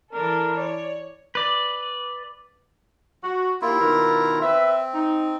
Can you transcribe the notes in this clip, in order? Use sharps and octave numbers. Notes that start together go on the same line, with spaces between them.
E3 D4 A4 A#4
C#5 D5
B4 D5
F#4
D#2 A#3 E4 F4
B2 D#3 A#4
C4 B4 E5
D#4